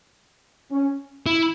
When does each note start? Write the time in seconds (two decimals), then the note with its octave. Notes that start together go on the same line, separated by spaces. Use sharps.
0.71 C#4
1.26 E4